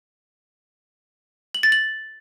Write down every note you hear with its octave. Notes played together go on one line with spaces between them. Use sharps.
F#7
A6
F#7